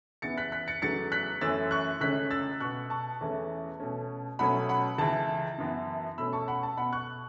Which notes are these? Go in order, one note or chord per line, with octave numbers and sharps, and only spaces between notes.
E2 C#3 E3 B3 A6 C#7
F#6 B6
F#6 B6
A6 C#7
E2 C#3 F#3 A3 A6 C#7
F#6 B6
F#2 E3 A3 C#4 E6 A6
C#6 F#6
C#2 C#3 A3 C#4 F#6 B6
E6 A6
B2 B3 C#6 F#6
A5 C#6
E2 E3 A3 C#4
B2 A3 C#4
B2 F#3 A3 C#4 F#5 B5
F#5 B5
C#2 C#3 E3 A5
F#2 E3 B3
B2 A3 C#4 B5 E6
A5 C#6
F#5 B5
A5
B2 B3 F#5 B5
C#6 F#6